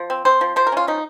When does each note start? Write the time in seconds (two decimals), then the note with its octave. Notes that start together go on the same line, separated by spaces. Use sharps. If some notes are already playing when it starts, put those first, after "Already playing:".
Already playing: F3
0.10 C4
0.25 C4 C5
0.41 F3
0.56 F3 C5
0.67 A#4
0.72 C#4 F4
0.87 F3 D#4